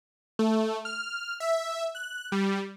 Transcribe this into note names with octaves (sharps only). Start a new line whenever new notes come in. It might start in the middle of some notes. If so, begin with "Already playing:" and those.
A3
F6
E5
F#6
G3